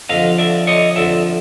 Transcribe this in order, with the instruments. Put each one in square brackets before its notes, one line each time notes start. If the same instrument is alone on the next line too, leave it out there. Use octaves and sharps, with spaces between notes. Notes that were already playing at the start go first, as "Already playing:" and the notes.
[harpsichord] F2 D3 F3 [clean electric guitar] D#5 F5
[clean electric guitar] D5 E5
C#5 D#5
[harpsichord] F2 D3 F3 [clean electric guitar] D5 E5